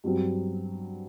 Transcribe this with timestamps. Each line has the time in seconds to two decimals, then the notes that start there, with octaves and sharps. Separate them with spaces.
0.04 G2 F#3 C4